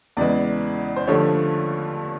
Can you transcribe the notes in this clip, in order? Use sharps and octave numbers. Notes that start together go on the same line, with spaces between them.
E2 C#3 E3 G#3 D5
C5
G2 D3 F3 A3 C#5